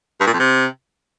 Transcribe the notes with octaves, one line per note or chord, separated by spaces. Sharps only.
G2
A#2
F2
C3